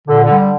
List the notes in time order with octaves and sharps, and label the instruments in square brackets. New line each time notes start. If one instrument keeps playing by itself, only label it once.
[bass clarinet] A#2 [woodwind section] D3
[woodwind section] D3
[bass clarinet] G3
[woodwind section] D3